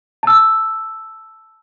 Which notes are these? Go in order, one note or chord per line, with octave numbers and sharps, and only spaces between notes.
A5 E6